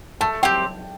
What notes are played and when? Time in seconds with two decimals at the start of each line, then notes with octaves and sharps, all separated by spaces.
0.21 A3 A5
0.43 C4 G4 G5